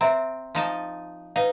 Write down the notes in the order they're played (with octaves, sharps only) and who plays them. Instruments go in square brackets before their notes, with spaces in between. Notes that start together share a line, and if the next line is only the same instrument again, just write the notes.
[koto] C4 [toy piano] C5 E5 A#5
[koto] F3 D#4 A5
[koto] D#4 [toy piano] B4 F5